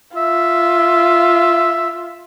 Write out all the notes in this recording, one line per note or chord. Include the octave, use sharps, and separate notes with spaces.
F4 E5